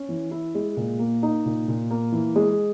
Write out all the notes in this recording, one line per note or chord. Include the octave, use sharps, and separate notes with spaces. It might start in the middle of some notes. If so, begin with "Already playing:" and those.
Already playing: C#4
E3
E4
G#3
A#2
A#3
D#4
A#2
A#2
A#3
E3
G#3